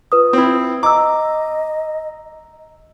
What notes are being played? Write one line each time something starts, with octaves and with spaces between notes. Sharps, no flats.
F4 B4 D#6
C4 E4
D#5 A#5 D6 E6